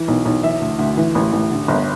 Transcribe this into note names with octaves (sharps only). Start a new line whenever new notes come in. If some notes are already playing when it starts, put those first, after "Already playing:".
Already playing: E3
B1
B1
E3 E5
D2
D2
E3
A1
A1
D3
G1